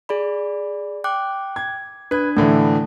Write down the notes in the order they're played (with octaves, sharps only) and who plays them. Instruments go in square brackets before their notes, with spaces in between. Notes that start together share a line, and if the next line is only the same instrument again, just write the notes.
[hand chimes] G#4 D5 B5
G5 D6 F#6
[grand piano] G#6
[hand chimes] D4 G#6 [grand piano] B4
[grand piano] A2 D3 E3 [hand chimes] A3